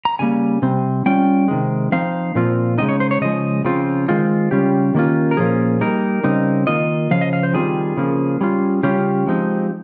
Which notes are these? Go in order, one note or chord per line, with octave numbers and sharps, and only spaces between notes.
A#5
C#3 G3 A#3 G#5
C3 G3 C4
G3 C#4 F4 G5
C3 D#3 G#3
F3 C4 D#4 F5
A#2 F3 C4 F4
C#3 G#3 C4 D#4 D#5
C#5
C5
C#5
C#3 F3 G#3 D#5
C#3 F3 C4 F4
D#3 G#3 C4 F4
C#3 G3 C#4 F4 G4
D#3 A#3 C#4 F4
A#4
A#2 F3 A#3 C#4 F4 G#4
G3 A#3 D#4 A#4
C#3 G3 C4 D#4
D#3 A#3 F4 D#5
C#3 F3 F5
D#5
F5
C5
D#3 G3 C4 F4 G#4
C#3 F3 A#3
G3 C#4 F4
C#3 G3 C#4 F4 G4
F3 G#3 C4 D#4